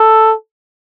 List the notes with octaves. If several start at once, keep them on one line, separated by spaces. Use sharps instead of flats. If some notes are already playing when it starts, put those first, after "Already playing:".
Already playing: A4